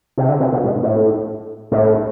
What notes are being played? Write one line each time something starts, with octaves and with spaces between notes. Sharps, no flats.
C3
D3
C3
B2
G#2
A2
A2